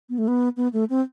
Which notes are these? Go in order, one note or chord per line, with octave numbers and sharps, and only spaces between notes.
B3
A3
B3
B3
A3
C4